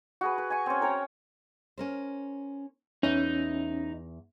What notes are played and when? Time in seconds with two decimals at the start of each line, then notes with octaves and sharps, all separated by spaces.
0.21 F#4 G#4 B4
0.38 B4
0.50 G#5 C#6
0.66 C4 C#4
0.81 A#4 C#5 G5 A#5
1.78 C#4 A#4 C5
3.03 E2 C#4 D#4 B4 E5